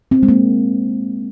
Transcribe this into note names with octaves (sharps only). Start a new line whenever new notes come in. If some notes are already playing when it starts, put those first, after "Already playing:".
C4
G#3
A#3